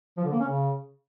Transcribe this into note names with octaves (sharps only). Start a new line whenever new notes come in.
F3
D3
A#3
C#4
C#3